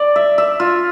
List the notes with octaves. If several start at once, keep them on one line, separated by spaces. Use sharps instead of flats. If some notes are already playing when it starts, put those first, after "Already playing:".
Already playing: D5
E5
E5
F4